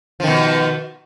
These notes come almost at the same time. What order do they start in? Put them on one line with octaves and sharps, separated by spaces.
F3 D#3 B2